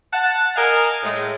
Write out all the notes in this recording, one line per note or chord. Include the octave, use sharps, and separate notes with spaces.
F#5 A5
A#4 D#5 F5 G#5 A#5
A2 G#3